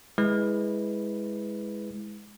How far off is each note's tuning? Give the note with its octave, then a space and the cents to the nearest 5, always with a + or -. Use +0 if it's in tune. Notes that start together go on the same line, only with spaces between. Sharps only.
G#3 +0 E4 -15 B4 +0